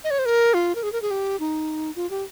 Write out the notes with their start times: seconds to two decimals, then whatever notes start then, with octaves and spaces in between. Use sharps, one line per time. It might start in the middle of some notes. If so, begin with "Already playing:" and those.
0.04 D#5
0.11 C#5
0.19 C5
0.26 A#4
0.54 F4
0.75 A#4
0.83 G#4
0.92 A#4
1.02 G#4
1.11 G4
1.40 D#4
1.96 F4
2.10 G4